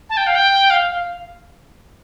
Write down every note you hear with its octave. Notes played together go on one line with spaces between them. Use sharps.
A5
G5
F5
G5
F5
F5